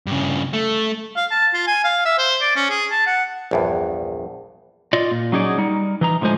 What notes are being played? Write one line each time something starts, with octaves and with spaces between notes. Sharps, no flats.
G2 C#3
A3
F5
A5
F4
G#5
F5
E5
C5
D5
C#4
G#4
A5
F#5
A#1 E2 G2
F4 D5 D#5
A#2
F#3 C#4 D#4 G#4 D5
G3 D#4
E3 D#4 A#5
A2 D3 F3 G#3 C5 G#5